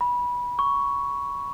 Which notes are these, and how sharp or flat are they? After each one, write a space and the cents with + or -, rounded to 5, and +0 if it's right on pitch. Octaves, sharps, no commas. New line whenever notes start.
B5 -20
C#6 +10